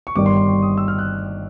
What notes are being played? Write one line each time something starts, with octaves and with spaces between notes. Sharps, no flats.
C#6
G1 G2 D#3 G3 D6
C6
C6
C#6
D#6
E6
F6
F#6